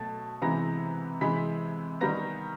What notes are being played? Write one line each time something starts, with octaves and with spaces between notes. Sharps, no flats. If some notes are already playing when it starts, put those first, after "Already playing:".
Already playing: B2 F#3 A3 A5 A6
C3 E3 G#3 B3 A#5 A#6
C3 E3 G#3 B5 B6
D#3 G3 B3 A#5 A#6